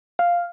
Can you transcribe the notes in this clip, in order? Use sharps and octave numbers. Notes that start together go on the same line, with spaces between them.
F5